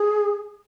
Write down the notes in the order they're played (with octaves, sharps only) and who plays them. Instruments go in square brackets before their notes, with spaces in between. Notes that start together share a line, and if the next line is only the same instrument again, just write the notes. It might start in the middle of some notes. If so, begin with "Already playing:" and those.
Already playing: [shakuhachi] G#4